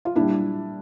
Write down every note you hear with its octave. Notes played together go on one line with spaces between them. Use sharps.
F4
A#2 G3 D4 E4